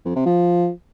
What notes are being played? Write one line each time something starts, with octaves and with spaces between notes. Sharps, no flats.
F2
C3
F3